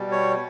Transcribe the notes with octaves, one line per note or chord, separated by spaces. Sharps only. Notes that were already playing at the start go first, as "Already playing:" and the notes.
Already playing: B2 G3
C#5